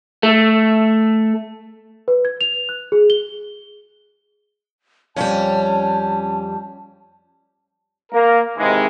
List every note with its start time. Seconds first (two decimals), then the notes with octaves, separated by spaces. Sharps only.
0.23 A3
2.08 B4
2.25 G#6
2.41 F7
2.69 F#6
2.92 G#4
3.10 G7
5.16 F2 G3 C#4 A5
8.12 A#3 A#4
8.58 G#2 C3 D#3 E3 G#3